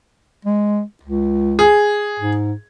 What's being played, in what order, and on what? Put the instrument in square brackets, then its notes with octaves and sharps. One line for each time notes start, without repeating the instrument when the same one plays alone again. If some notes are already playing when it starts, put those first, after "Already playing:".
[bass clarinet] G#3
C#2
[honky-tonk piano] G#4
[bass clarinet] G#2